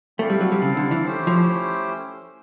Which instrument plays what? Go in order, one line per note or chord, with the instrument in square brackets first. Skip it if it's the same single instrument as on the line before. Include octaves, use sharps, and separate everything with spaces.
[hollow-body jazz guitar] A3 [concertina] C4 E4 A4 D5 F5
[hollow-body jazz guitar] G3
F#3
G3
C#3
D3
E3
[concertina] A3 C#4 E4 G4 C5
[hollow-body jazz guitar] F3